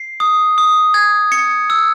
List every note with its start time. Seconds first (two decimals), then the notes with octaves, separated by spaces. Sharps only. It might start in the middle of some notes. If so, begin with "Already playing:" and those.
Already playing: C7
0.20 D#6
0.58 D#6
0.94 G#6
1.32 C#7
1.70 E6